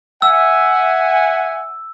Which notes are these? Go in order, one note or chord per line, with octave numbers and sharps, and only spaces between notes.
E5 F#5 G#5 E6